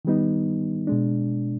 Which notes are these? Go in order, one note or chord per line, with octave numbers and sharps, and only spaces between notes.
D#3 G3 B3 D#4
B2 G#3 D4